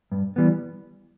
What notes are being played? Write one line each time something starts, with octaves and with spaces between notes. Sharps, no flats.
G2
E3 G3 B3